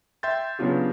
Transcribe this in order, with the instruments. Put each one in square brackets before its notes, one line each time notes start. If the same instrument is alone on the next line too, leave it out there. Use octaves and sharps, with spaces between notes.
[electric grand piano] E5 G5 C6 G6 A6
C#3 F#3 B3 D4 F4 G4